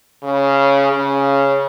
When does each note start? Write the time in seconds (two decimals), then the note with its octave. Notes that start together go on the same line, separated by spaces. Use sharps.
0.24 C#3
0.93 C#3